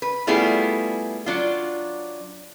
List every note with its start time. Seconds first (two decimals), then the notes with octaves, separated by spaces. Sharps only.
0.02 B4
0.27 G3 A3 B3 E4 F4 G#4
1.26 F#3 D4 F4